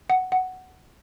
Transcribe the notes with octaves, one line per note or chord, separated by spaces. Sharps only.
F#5
F#5